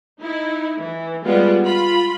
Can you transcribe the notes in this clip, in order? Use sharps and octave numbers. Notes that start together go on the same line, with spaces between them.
D#4 E4
E3
G3 G#3 B3 F4
F4 B5